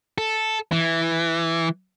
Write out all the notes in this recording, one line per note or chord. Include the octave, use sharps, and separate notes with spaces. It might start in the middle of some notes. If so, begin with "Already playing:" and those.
A4
E3